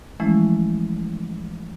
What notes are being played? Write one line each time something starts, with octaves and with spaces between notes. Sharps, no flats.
E3 F3 G#3 A3 C#4 E4